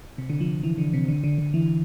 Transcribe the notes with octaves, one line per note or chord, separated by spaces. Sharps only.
C3
D3
F3
E3
D3
C3
D3
D3
D3
E3